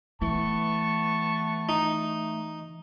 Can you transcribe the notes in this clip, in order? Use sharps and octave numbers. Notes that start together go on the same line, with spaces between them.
E3 A3 B3 A5 C#6
D#4